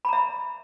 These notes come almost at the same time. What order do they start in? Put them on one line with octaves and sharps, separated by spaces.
B5 A#5 E5